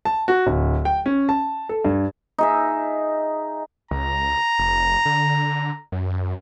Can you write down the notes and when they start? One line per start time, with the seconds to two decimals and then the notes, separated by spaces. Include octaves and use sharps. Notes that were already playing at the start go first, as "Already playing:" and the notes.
0.05 A5
0.28 F#4
0.47 D1
0.85 G5
1.06 C#4
1.29 A5
1.69 A4
1.85 G2
2.38 D#4 G#4 E5
3.91 C#2 A#5
4.59 F1
5.06 D3
5.92 F#2